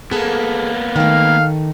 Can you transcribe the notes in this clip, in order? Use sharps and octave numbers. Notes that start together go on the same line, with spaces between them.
A#3 B3 G#4 A4
D#3 A3 F5